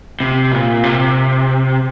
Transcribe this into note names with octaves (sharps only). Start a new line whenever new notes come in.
C3
A#2
C3